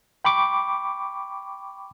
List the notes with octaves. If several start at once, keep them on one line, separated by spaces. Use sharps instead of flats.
G5 B5 C#6 D6